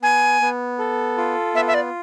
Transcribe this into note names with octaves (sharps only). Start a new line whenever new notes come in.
B3 G#5
B3
A4
F4
B3 E5
E5
D5